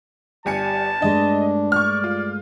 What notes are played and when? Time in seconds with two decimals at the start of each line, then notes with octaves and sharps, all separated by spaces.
0.46 G1 G3 G#5 A5 C#7
1.02 G2 G#3 A3 D4 D#5
1.72 D5 C#6 F6
2.04 F4